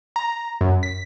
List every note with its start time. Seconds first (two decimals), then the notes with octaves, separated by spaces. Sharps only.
0.16 A#5
0.61 F#2
0.83 B6